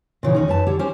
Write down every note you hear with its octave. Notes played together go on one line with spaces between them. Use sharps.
A#2 C#3 E3
D#2 C#4 D#4
F#2 B4 A5
D3 G4 C#5
C#4 G4 A#4 C5